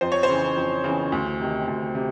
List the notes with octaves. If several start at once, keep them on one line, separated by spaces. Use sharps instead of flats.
F2 C5
C#5
C5
C#3 E3
F2
C#3 E3
D2
C3 D#3
D2
C3